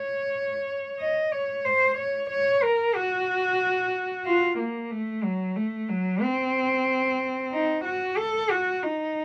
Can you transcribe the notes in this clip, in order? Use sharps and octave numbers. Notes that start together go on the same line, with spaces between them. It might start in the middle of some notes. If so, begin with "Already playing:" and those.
Already playing: C#5
D#5
C#5
C5
C#5
C#5
A#4
F#4
F4
A#3
A3
F#3
A3
F#3
C4
D#4
F#4
A4
F#4
D#4